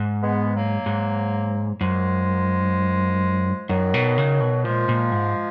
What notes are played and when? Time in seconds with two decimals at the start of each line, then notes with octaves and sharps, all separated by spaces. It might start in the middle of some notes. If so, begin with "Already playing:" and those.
Already playing: G#2
0.22 G#3 B3
0.54 F#3 A#3
0.86 G#2
1.81 F#2 F3 G#3
3.69 F#2 D#3 F#3
3.94 B2
4.18 C#3
4.40 B2
4.65 A#2 F3 G#3
4.89 A#2
5.12 G#2